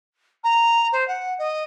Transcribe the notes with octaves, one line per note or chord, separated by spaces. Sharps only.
A#5
C5
F#5
D#5